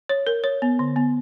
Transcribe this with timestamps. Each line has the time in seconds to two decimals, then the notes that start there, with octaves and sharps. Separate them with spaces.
0.09 C#5
0.27 A#4
0.44 C#5
0.62 B3
0.79 D3
0.96 B3